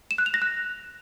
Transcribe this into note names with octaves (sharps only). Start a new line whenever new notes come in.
E7
F#6
F7
A#6
F#6